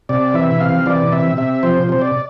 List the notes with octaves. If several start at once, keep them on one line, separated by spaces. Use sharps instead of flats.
C3 D5
E3 E5
C3 F5
E3 D5
C3 E5
C3 E5
F3 C5
C3 C5
D5